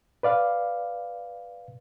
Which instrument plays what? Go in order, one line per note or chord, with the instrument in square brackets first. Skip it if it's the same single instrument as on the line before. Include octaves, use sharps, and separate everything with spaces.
[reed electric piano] B4 D5 F5